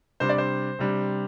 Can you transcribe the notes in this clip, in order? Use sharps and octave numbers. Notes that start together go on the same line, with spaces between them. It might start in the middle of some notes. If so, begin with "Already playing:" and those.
C3 G3 D4 C5
D5
C5
C3 G3 D4